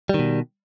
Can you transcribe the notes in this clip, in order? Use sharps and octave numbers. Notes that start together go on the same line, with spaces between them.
B2 D#3 G3